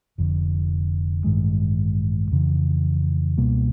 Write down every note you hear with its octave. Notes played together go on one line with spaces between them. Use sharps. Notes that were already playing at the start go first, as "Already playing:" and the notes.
F1 F2 D3
A1 G2 D#3 G#3
F2 C#3 E3
C#2 B2 G3 A#3